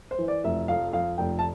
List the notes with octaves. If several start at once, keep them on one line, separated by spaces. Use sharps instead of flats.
C5
E3
D5
F1 E5
F2 F5
F2 F5
F1 G5
A5